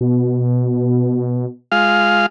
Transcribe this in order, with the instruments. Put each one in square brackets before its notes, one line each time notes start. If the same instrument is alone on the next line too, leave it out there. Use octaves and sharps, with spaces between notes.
[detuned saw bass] B2
[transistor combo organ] G#3 F4 F5